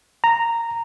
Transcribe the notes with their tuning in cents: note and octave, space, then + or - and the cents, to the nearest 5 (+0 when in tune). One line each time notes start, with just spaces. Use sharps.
A#5 -10